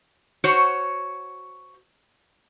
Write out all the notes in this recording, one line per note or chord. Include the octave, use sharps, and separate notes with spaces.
F#4 C5 C#5